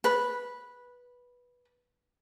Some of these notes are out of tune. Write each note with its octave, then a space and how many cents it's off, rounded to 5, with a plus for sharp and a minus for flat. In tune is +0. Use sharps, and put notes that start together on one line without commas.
B4 -10